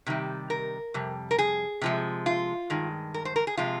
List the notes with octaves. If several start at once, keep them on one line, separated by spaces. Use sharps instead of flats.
C3 D#3 G3
A#4
F2 C3 G3
A#4
G#4
C3 F3 G#3
F4
G2 D#3 G#3
A#4
C5
A#4
G#4
C3 F3 G#3 F4